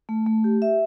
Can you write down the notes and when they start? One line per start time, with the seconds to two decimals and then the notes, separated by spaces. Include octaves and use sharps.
0.09 A3
0.26 A3
0.44 G4
0.62 E5